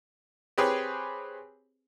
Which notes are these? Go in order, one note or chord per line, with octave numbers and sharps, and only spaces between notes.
C4 G4 G#4 B4 C#5